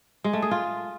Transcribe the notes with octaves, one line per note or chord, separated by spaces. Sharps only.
G#3
A3
G#4
F4